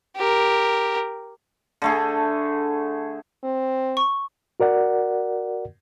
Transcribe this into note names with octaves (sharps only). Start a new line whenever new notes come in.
G4 A#4
D3 A3 G#4
C4
C#6
F#4 A#4 D5 F#5